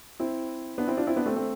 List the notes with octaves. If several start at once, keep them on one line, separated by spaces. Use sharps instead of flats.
C4 E4
B3 D4
C4 E4
D4 F4
C4 E4
B3 D4
A3 C4
A3 C4